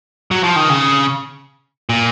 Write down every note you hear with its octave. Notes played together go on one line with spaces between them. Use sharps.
F#3
F3
D#3
C#3
A#2